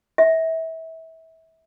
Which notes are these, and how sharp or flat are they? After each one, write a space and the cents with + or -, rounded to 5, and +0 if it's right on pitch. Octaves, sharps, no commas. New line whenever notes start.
E5 -25